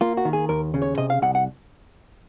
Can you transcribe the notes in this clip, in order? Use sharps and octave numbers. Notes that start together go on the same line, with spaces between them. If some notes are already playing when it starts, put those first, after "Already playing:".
A#3 F4
F#4
D#3
G#4
D#2 A#4
C#3
C#5
C3 D#5
F5
C2 F#5
F#5